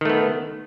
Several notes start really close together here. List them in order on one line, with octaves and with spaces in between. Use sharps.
D#3 A3 B3